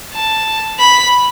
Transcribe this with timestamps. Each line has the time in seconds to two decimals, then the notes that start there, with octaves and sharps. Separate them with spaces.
0.14 A5
0.80 B5